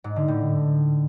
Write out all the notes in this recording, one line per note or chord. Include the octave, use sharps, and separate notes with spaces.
G#2
D3
A2